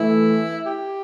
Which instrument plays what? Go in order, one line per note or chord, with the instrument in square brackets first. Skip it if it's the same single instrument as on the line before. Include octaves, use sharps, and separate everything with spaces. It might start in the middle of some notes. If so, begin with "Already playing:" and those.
Already playing: [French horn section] E3 A3 [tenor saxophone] E4
[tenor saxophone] G4